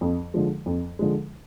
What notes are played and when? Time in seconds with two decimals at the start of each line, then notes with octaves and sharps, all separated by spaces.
0.01 F2
0.34 D3 F3 G#3
0.66 F2
0.99 D3 F3 G#3